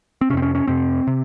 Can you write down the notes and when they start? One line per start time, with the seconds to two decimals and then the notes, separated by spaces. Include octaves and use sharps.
0.21 C4
0.30 C3 C#4
0.34 F2 C4
0.42 C#4
0.55 C#4
0.67 F2 C3 C4
1.07 C3